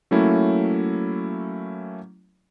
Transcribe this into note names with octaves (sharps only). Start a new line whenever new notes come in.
F#3 A3 A#3 C#4 E4